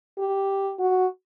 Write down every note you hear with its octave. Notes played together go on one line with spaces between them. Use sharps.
G4
F#4